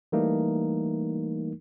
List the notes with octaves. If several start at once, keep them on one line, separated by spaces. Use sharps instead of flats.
E3 G3 A3 A#3 D#4 A#4